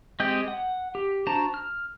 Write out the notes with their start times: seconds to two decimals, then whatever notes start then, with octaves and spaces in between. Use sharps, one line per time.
0.20 G#3 C4 G4 D#5 G6
0.48 F#5
0.95 G4
1.27 D4 F#4 C5 A5 A#5
1.54 F6